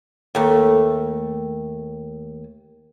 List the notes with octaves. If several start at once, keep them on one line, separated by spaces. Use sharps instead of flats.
D#2 A3